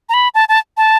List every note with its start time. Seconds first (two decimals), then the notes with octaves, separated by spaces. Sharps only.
0.09 A#5
0.14 B5
0.35 A5
0.49 A5
0.77 A5